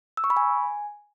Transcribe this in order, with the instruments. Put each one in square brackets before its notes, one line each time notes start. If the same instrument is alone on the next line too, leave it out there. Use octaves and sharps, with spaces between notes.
[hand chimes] E6
C#6
B5
G#5